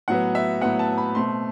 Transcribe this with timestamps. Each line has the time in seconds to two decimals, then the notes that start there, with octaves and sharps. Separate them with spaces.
0.08 A2 F#3 B3 F#5
0.35 E5
0.61 A2 F#3 B3 F#5
0.79 A5
0.98 B5
1.15 B2 A3 C4 C6